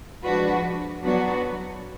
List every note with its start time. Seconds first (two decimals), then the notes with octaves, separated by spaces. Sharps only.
0.23 F3 G#3 D4 F#4 B4
1.04 F#3 B3 D4 F#4 B4